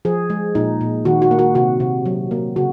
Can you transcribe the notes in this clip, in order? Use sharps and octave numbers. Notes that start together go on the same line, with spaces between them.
F3 G#4
G#3
A#2 D#4
A#2
D#3 F#4
F#4
A#3
F#4
C3 F#4
C3
F#3
A#3
C#3 F#4